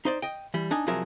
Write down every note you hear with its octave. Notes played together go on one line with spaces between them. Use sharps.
D#4 C5 D5
D#5 G5
E3 G3
D4 D#4 G#5
C2 F3 F#3 G#4 A#4 E5